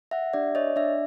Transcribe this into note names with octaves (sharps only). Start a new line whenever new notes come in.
E5 F#5
D4 G4 D5 E5
C#5 D#5
D4 D5 E5